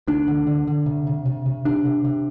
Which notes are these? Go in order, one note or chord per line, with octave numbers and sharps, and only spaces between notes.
D2 D4
D3
D3
D3
C3
C3
C3
C3
C3 D4
C3
C3